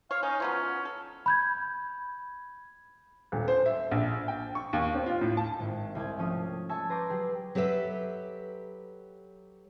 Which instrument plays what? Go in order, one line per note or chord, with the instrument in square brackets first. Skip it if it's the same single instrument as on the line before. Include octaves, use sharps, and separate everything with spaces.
[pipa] C#5 [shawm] F5
[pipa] C#4 [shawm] D#4
[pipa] F3 F#3 B3 [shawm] C#4
[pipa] A4
[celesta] B5 G6 G#6
[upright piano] D#1
C5
E5
A#1
G5
C#6
D#2
C4
F4
A2
A5
[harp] G#1
C2 G#6
F3 A3 C#4 D#6
E5 G#5 A5 C#6
B4 A#5 C6 D6 G6
F#3 G4 G#4
[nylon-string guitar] F#3 G4 A4 B4 E5